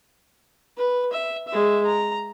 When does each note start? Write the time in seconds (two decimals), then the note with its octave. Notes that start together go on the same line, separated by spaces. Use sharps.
0.77 B4
1.13 E5
1.48 G#3 E5
1.85 A#5